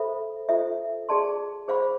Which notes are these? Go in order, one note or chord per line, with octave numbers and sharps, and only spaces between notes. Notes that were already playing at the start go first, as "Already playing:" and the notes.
Already playing: A4 C5 E5 B5
F4 A4 C5 E5
G#4 D5 A5 C6
G#4 C5 F5 B5